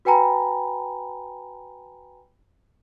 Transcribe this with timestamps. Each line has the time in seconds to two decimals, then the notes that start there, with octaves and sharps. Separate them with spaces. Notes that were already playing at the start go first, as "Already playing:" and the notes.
0.05 F#4 B4 G5 G#5 A#5 B5